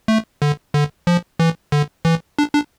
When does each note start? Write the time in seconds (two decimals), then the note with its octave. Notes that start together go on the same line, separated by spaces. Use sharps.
0.08 A3
0.42 D3
0.74 D3
1.07 F3
1.40 E3
1.72 D3
2.05 E3
2.39 D4
2.54 D4